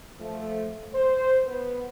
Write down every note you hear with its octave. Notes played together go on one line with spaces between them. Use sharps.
F3 A3
C5
B3 B4